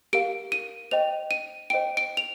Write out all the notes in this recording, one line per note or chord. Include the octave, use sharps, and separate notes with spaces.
G4 A#4 F5 D7
D#7
C5 D#5 G5 F7
D#7
C5 D#5 G5 D7
D7
F7